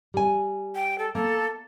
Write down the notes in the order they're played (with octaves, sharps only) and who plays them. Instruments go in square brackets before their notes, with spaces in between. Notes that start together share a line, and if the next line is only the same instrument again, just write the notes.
[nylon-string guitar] G3 G#5
[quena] G5
A4
[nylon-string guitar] A#3 [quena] A4